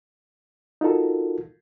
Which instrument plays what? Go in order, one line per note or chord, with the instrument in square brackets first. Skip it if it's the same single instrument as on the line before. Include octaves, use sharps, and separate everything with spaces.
[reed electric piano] D#4 F4 F#4 A4 A#4